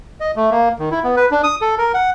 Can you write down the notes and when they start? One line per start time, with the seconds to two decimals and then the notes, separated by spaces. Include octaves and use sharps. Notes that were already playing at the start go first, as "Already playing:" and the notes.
0.20 D#5
0.36 A3
0.51 A#3
0.79 D#3
0.91 E4
1.04 B3
1.16 B4
1.31 D4
1.43 D#6
1.61 A4
1.78 A#4
1.94 F#5